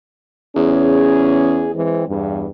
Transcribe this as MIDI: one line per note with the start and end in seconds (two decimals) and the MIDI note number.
0.56 1.87 40
0.56 1.70 61
0.56 1.70 68
1.75 2.03 52
1.75 2.03 56
1.75 2.03 60
2.08 2.46 40
2.08 2.46 43